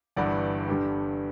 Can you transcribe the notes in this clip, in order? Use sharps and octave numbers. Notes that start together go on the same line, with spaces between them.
G1 G2 E3 D5 F#5
G1 G2 D3 G3